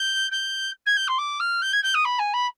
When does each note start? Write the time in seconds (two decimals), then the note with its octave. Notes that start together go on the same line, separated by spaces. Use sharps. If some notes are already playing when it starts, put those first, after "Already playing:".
Already playing: G6
0.31 G6
0.86 G#6
0.96 G6
1.07 C6
1.18 D6
1.40 F6
1.62 G6
1.72 G#6
1.83 G6
1.94 D#6
2.05 B5
2.19 G#5
2.33 B5